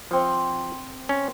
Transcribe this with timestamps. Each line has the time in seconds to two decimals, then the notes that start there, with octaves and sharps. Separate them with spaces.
0.11 F3 C4 F#5
1.09 C#4